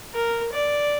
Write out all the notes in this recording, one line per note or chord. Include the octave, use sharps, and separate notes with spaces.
A#4
D5